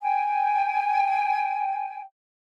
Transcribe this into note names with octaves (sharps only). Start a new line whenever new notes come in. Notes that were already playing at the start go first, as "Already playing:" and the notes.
G5 G#5